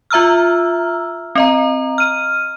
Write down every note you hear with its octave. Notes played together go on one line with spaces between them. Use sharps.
F4 E5 A#5 E6 F6
C4 D#5 A#5
F6 D#7